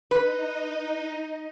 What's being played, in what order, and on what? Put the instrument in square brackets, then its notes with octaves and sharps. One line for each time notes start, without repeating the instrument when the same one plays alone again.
[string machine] D#4 D#5 [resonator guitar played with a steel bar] B4